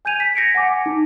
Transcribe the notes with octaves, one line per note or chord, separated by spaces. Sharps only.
G#5 G6 G#6 D#7 F7
B6
G#6 A#6 C#7 D7
F#5 G#5 D6
D#4